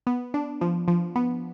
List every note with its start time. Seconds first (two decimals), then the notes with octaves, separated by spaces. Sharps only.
0.07 B3
0.34 D4
0.61 F3
0.88 F3
1.16 B3